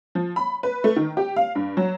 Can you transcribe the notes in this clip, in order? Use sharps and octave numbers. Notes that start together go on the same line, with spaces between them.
F3
B5
B4
A3
D#3
G4
F5
G2
F#3